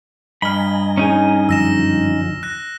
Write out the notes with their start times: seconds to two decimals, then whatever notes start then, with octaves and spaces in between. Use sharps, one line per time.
0.42 G2 D#5 G#5 A#5 B5 F6 G7
0.97 C#4 D#4 G#4
1.49 F#2 D3 F3 E6 A#6 E7
2.43 F#6 A#6